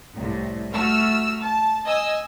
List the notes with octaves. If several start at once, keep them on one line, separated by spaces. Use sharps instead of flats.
C2 A2
A3 F#4 E6 F6
A5
D#5 G#5 E6